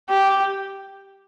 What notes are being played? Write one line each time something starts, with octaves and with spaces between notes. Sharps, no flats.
G4